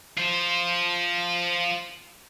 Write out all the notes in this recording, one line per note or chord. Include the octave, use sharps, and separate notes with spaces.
F4 C5